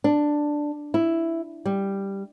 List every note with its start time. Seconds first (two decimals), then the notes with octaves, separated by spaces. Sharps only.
0.04 D4
0.94 E4
1.65 G3